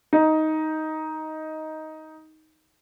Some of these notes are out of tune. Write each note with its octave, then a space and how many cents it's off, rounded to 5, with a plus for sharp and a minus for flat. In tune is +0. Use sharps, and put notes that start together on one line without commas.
D#4 +10